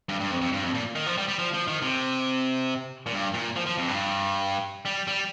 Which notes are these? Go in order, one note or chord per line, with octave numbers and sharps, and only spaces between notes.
G2
G2
F2
F2
G2
F2
A#2
D#3
F3
G3
G3
F3
F3
D#3
C3
A#2
G2
A#2
F3
F3
F2
G2
G3
G3